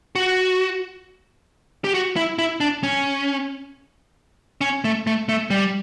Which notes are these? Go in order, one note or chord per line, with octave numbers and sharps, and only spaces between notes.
F#4
G4
F#4
E4
E4
D4
C#4
C#4
A3
A3
A3
G3